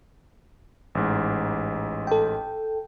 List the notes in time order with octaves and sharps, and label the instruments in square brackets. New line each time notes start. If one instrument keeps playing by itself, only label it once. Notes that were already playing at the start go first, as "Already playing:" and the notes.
[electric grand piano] A1 G#2
[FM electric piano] A4 G5